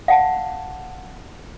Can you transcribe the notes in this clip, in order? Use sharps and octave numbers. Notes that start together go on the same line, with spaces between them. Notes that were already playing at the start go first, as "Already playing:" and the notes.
F5 F#5 A5